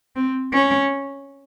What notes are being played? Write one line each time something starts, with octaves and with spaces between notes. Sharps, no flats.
C4
C#4